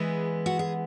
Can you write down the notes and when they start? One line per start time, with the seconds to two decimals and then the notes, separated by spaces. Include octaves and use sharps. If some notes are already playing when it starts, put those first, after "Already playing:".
Already playing: E3 G#3 B3 G#4
0.46 F#4
0.59 G#4